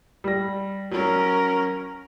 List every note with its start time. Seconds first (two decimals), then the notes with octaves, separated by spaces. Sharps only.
0.24 G3 A#6
0.91 F#3 C#4 A#4